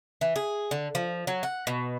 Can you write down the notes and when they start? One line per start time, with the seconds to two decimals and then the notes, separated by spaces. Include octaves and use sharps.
0.21 E3
0.36 G#4
0.71 D3
0.95 F3
1.27 F#3
1.43 F#5
1.67 B2